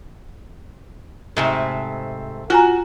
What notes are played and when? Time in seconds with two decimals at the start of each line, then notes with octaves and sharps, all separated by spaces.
1.37 G#2 C3 A3
2.50 F4 F#4 G#5 A#5